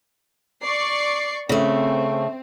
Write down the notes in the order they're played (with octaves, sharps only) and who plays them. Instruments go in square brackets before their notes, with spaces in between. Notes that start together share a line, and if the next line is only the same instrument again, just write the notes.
[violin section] D5 C#6 C7
[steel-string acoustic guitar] C#3 A3 [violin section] C4